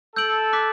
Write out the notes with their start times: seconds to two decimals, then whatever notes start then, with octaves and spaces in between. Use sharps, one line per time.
0.16 A4 E6 G6 D7 F#7
0.53 D6 F#6 B6